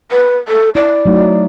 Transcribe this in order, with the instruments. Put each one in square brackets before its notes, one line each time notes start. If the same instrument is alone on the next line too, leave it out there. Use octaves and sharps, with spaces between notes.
[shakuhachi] B4
A4
[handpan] E4 [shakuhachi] D5
[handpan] F#3 A3 D#4